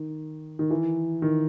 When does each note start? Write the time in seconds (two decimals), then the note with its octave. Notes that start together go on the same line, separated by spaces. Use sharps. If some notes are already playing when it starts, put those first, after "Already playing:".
Already playing: D#3
0.59 D#3
0.70 E3
1.22 D#3